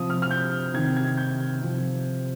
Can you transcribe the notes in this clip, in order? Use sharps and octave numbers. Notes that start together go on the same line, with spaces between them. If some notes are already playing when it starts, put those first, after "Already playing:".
Already playing: C3 F3 D#6
F6
F6
G6
C3 D#3 G#6
G#6
G6
C3 F3